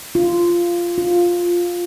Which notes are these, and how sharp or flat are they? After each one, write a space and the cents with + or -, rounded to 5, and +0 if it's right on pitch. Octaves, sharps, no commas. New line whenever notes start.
F4 -10
F4 +5